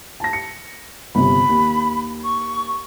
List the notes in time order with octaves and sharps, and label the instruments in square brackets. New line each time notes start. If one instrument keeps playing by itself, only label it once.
[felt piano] A5 A#6
C#7
[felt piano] G1 C3 [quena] B5
[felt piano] D#2
[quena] C#6